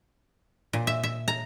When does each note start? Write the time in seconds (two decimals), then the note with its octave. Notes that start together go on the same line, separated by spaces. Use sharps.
0.73 A#2
0.87 E5
1.03 E5
1.28 A#5